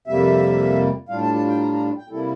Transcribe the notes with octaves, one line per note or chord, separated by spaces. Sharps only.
F2 C3 G3 A#3 E5
A2 G3 D4 F4 F5
A5
A5
G5
A#5
A#5
G5
C3 G3 A#3 E4 A4